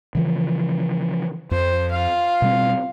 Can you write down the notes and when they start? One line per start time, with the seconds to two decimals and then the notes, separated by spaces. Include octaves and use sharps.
0.15 C#3 E3 F3
1.51 F2 C5
1.91 F4 F5
2.42 B2 G3 C4